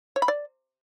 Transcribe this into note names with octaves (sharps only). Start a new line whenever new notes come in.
C#5
B5
D5